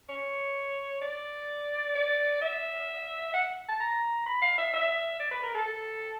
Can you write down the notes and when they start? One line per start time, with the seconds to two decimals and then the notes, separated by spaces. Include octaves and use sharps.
0.09 C#5
1.01 D5
1.95 D5
2.41 E5
3.34 F#5
3.68 A5
3.80 A#5
4.26 B5
4.42 F5
4.58 E5
4.73 E5
5.19 D5
5.31 B4
5.43 A#4
5.54 A4